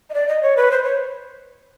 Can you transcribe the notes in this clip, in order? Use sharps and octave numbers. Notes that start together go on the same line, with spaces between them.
D#5
D5
D#5
C#5
B4
C5
C#5